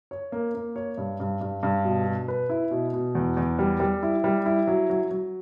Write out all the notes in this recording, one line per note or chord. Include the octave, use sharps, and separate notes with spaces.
C#5
A#3
A#3
C#5
G2
G2
G2
G2
B2
B2
B4
E4
B2
B2
E2
E2
G3
G3
E4
G3
E4
F#3
F#3
F#3